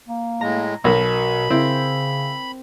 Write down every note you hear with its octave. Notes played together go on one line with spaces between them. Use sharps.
A#3
A2 G#3 A#5
B1 B2 A#4 B5
C#3 C4 E4